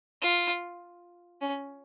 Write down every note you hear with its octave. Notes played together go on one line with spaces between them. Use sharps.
F4
C#4